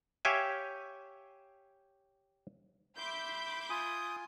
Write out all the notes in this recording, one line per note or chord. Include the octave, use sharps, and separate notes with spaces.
G4 C#5 E5 F5 G5 G#5
E5 B5 C6 D6 G6
F4 G#5 D#6